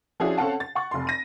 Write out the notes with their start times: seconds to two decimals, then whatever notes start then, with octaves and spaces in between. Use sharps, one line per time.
0.20 F3 C#4 D4 E4 F#4 G#4
0.37 C4 C#4 A4 F5 F#5 A5
0.60 A6
0.75 F#5 C#6
0.91 F1 C6
1.07 A#6 D#7